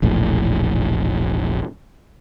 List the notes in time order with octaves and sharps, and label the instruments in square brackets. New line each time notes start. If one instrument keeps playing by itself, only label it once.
[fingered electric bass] E1 A#1 A2